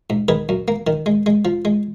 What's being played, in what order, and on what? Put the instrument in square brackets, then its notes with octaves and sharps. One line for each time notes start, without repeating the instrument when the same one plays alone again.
[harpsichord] G#2
D#3 G#4 B4
F#2
A#3
D#3
G#3
G#3
F3
G#3